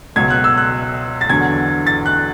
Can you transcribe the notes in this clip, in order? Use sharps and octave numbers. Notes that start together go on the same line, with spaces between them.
C#2 B2 F#3 G#6
F#6
E6
F#6
A6
E2 D3 F#3 G#6
A6
F#6